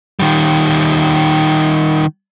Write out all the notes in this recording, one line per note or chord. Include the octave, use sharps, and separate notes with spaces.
D#3 G3